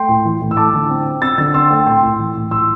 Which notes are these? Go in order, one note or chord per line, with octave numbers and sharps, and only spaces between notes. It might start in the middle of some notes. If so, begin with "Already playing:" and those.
Already playing: A3 G5 C6
A2
E3
A2
E6
A3 A5 D6
D3
C4
C4
C4 E6 A6
D3 E6 A6
C4 C6 E6
A3 G5
A2 G5 C6
A2
E3
A2
A2 C6 E6